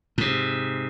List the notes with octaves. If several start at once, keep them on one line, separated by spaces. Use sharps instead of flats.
G#2 C3